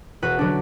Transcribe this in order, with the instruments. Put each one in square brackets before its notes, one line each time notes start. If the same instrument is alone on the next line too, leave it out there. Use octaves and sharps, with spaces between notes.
[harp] E1 F#4 B4
D3 F#3 D4 F#4